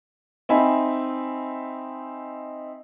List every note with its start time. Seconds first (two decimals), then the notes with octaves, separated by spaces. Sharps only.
0.49 C4 D#4 E5 G#5 B5